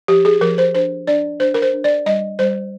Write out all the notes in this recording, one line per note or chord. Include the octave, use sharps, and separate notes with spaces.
F3 G4
G#4
F3 A#4
C5
D4 C5
D4 D5
D4 C5
A#4
C5
D4
D5
G3 D#5
G3 C5